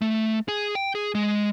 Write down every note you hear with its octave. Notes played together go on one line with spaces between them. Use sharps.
A3
G#4
G5
G#4
G#3